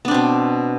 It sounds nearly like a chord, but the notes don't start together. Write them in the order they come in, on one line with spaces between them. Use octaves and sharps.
B3 D4 C4 B2